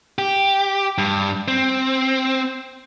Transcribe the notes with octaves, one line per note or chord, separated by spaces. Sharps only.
G4
G2
C4